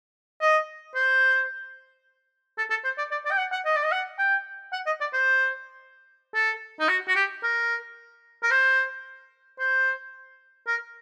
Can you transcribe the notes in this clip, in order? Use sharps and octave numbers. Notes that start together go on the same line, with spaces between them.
D#5
C5
A4
A4
C5
D5
D5
D5
G5
F#5
F#5
D#5
D5
D#5
F#5
G5
F#5
D#5
D5
C5
A4
D#4
F#4
F#4
G4
A#4
A#4
C5
C5
A#4